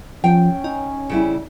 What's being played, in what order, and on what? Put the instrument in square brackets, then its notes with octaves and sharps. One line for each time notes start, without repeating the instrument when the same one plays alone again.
[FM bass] F3 [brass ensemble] C#4 [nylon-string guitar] G5
[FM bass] D#4
[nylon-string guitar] C#3 G3 E4